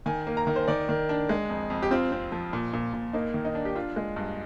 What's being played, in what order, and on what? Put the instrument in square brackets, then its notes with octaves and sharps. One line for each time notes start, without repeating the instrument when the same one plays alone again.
[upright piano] D#3 G#5
A#3
A#5
D#3
C5
D#3 D5
D#3
D4
G#3
F2
F2
G4
C4 F4
C4
F3
A#2
A#2
A#2
A#3 D#4
D#3
D#4
D4
G4
D4 F4
G#3
G2